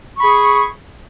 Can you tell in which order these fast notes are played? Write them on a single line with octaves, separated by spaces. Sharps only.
C#6 B5 G#4